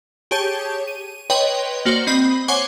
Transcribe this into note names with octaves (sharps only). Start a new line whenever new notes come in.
G4 G#4 C#5 A5 G6
D#7
B4 C#5 D#5 G5 C6
A#3 F#4 C5 D5
C4 D#5 B5
C5 C#5 F#5 G#5 C#6 D6